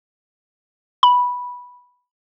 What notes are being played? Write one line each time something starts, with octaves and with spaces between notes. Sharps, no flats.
B5